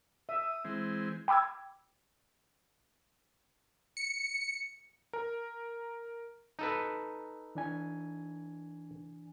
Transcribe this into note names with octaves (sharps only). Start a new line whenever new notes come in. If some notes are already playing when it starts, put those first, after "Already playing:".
E5 D#6
E3 G#3 C4
G5 B5 D6 E6 G#6
C#7
A#4
D#4 A4 B4
E3 D4 G#5